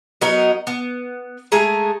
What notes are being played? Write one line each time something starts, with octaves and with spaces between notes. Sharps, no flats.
F#3 B3 D#4 A#4
B3
G#3 A3 G#4 A#5